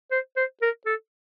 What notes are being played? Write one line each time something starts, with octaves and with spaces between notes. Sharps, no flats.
C5
C5
A#4
A4